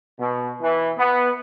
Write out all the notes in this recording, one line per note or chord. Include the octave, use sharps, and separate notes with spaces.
B2
E3
B3